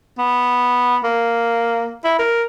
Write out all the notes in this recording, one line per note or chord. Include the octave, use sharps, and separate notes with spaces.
B3
A#3
E4
A#4